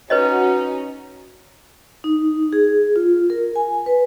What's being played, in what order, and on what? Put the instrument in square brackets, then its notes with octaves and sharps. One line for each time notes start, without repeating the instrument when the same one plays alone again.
[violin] C#4 D#4 [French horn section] F#4 [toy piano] B4 C#5 D#5
[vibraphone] D#4
G#4
F4
A#4
G#5
B4